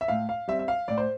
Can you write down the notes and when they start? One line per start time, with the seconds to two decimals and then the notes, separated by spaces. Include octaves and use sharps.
0.01 E5
0.08 A2 F5
0.29 F5
0.48 G3 C4 E5
0.59 E5
0.68 F5
0.88 A2 D5
0.98 C5